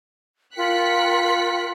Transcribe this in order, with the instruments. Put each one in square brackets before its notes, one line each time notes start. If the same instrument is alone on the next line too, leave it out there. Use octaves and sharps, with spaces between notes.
[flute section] F4 A#4 G5 [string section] F#6 B6 C#7